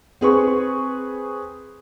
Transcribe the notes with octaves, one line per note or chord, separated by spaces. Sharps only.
C4 G#4 B4 C#6